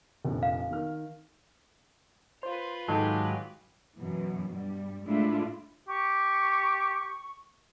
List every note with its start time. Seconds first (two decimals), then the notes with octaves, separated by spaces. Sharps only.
0.25 F1 A#1
0.43 F5
0.71 D#3 F6
2.43 F4 B4 C5
2.89 G#2 D#3 F#3 G#3 D#4 G4 A4
3.96 F#2 B2 E3
4.50 G2 G3
5.05 A2 G#3 A3 D4 E4 F4
5.88 G4 C#6